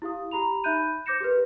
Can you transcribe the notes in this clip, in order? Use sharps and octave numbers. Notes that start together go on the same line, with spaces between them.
E4 G4 F5 D#6
G4 A#5 B5 F7
D#4 E5 B5 F#6 G6 D#7
C5 D6 G6 A#6 C#7 E7
G4 A#4 B4